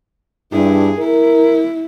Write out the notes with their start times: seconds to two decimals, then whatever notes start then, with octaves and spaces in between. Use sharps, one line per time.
0.52 G2 E4 G#4
0.98 E4 A#4